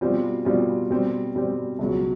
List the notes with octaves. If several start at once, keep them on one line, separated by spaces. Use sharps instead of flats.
B2 G3 C4 F4
B2 G3 C4 F4
B2 G3 C4
B2 G3 C4
C#2 B2 F#3